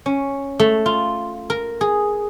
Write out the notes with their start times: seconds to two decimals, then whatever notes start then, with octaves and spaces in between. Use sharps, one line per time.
0.06 C#4
0.59 A3
0.86 F4
1.50 A#4
1.81 G#4